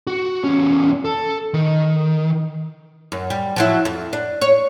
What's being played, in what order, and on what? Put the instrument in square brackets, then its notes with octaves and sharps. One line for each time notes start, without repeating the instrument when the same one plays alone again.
[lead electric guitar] F#4
E2 C#4
A4
D#3
[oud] F#2
G3
F3 F#3 E4
F2
D4
C#5